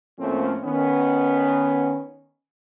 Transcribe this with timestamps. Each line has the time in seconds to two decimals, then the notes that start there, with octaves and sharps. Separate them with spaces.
0.19 A2 F3 A3 A#3 C4 C#4
0.64 D#3 B3 C#4